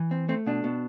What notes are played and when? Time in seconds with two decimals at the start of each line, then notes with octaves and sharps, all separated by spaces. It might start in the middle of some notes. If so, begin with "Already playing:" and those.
Already playing: E3
0.11 C4
0.29 A3 C4
0.46 B2 D4
0.64 B2